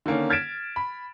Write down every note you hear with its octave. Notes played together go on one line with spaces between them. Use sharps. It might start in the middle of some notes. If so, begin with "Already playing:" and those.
D3 D#3 A#3 C#4
F6 G#6 A6 B6 D7 E7
B5